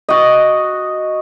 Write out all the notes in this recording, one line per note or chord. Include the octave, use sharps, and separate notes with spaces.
F#4 D#5